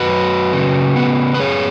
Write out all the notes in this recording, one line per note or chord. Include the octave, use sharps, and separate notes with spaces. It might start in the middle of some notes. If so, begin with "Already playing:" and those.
Already playing: F#2 F#4 B4
F#3
C#3
B3
B4
F#2 G#4 C#5